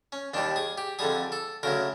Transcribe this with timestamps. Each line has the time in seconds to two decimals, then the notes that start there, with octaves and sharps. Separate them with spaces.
0.12 C#4
0.34 D#2 D#3 G3 D4
0.56 G#4
0.78 G4
0.99 F2 D3 G3 G#4
1.32 A4
1.63 D2 C#3 F#3 A#4